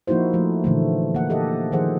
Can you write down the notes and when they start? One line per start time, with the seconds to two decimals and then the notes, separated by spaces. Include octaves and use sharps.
0.07 F3 A#3 D#4 E4 F#4 C5
0.33 F3 A3
0.64 A#2 D3 E3 A3
1.15 A#3 F#5
1.30 G4 A4 D#5 E5
1.72 D#3 F3 G#4 C5 F#5